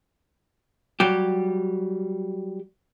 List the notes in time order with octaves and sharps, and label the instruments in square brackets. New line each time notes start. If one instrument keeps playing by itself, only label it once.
[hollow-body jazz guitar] F#3 G3 G4